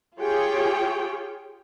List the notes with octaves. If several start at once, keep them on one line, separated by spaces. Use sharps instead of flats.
F4 G4 G#4 C#5 G5